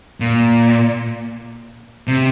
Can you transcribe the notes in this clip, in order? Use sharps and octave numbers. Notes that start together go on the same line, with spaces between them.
A#2
C3